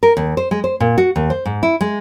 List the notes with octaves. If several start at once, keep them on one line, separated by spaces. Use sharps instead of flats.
A#4
D#2
C5
G#3
C5
A#2
F#4
D#2
C5
G#2
E4
G#3